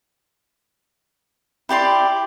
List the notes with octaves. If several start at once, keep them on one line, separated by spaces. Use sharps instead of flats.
E4 G4 D5 C6